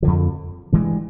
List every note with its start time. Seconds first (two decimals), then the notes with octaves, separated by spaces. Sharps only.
0.03 F2 D3 F3
0.72 G2 E3 G#3